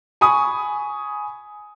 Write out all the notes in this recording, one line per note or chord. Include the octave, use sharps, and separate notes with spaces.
G#5 B5 C#6 D#6